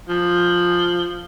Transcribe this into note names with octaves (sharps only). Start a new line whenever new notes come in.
F3